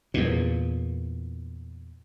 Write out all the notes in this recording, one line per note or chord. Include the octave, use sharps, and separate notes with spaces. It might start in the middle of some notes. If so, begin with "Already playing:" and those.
E2 A#2